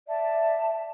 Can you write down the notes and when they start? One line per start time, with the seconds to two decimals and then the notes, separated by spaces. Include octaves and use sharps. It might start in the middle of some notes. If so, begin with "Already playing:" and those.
0.08 D5 E5 A5